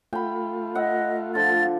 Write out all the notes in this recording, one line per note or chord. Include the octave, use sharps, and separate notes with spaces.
A3 F4 G5 B5
D#5 E5 F#5
D3 F3 A6